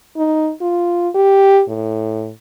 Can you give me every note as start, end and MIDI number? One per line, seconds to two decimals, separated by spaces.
0.17 0.51 63
0.61 1.09 65
1.15 1.62 67
1.69 2.30 45